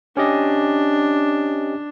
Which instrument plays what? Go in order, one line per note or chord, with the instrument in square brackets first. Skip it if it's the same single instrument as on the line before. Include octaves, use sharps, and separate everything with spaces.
[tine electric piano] C#4 G4 D#5 [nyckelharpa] D4